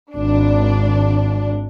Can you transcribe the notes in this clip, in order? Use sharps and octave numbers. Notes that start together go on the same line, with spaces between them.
G#1 D4